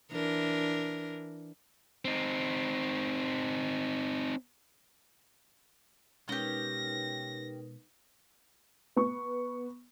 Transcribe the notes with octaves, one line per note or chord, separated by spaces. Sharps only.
E3 D4 A#4
C4 D#4
B2 G#3 C#4 D#4 G4 A#4 B4 A#6
B3 C#6